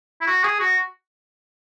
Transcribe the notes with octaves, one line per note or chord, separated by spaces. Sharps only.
E4
F#4
G#4
F#4